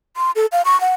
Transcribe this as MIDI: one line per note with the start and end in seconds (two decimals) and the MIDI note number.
0.17 0.31 84
0.36 0.46 69
0.52 0.62 77
0.65 0.79 85
0.81 0.94 78